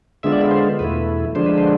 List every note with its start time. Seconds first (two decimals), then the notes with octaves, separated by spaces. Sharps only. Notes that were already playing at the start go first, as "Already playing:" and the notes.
0.23 D3 G#3 B3 F4 E5
0.33 D5
0.41 E5
0.51 C5
0.79 E2 B2 A3 E4 B4
1.35 D3 F3 G#3 D4 C5
1.46 B4
1.58 C5